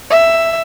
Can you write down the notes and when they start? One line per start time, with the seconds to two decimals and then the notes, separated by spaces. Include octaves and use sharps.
0.10 E5